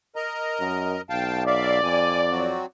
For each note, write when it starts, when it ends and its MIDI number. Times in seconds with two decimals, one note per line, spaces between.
0.16 1.01 70
0.16 1.01 75
0.16 1.01 82
0.60 0.97 42
1.10 1.81 35
1.10 1.44 77
1.10 1.44 79
1.10 1.44 81
1.47 2.65 74
1.47 1.79 76
1.47 1.79 77
1.83 2.56 41
1.83 2.21 80
2.31 2.66 54
2.31 2.66 60
2.31 2.66 66